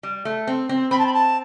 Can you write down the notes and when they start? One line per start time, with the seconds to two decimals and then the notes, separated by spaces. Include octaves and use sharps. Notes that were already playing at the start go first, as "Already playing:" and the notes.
0.03 G3
0.25 A3
0.47 C4
0.69 C4
0.91 C4 B5
0.98 A5
1.06 B5
1.13 A5